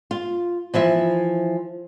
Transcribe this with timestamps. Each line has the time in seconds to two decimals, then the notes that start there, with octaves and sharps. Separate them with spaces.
0.11 F4
0.74 E3 F3 E4 E5